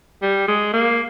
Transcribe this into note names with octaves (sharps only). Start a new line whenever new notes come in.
G3
G#3
A#3